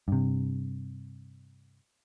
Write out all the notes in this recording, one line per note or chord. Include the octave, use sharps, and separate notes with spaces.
G2 C3